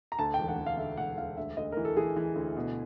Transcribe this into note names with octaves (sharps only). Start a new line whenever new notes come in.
A#5
D2 A5
E1 G5
F#5
E1
F5
D3 E5
E1 F#5
E1 F5
D2 E5
D2 D#5
E3 A#4
A4
E3 G#4
E3
D2
B2